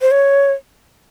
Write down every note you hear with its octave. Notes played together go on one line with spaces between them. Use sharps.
C5
C#5